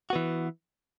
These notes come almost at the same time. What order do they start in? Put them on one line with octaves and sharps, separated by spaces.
F#4 B3 E3